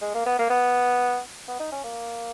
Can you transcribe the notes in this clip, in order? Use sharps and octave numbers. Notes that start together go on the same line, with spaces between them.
G#3
A#3
B3
A#3
B3
B3
D#4
C#4
A#3